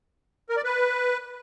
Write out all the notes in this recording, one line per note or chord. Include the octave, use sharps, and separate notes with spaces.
A#4
D5
B4